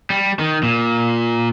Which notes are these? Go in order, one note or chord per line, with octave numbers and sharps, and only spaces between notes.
G3
D#3
A#2